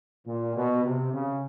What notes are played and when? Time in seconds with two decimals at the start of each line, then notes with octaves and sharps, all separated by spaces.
0.27 A#2
0.56 B2
0.85 C3
1.13 C#3